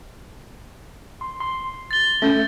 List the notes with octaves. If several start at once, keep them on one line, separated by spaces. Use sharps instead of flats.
C6
C6
A6 G7
A3 C#4 G6